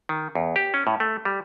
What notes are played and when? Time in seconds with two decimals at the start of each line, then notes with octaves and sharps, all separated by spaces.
0.09 D#3
0.35 E2
0.56 G4
0.74 C#4
0.87 A2
1.00 A3
1.25 G3